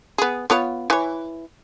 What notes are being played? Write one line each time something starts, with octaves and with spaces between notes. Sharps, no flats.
B3 G#4
B3 F4 C#5
E3 C#5